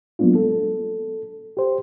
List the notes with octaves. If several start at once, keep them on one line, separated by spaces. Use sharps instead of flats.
F#3 G#3 A#3 B3 D4 F4
A4
G4 C5